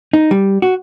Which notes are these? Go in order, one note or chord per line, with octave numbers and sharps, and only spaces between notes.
D#4
G3
F#4